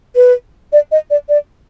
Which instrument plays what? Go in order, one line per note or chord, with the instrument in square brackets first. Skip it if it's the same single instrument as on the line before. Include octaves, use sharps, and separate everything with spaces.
[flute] B4
D5
D#5
D5
D5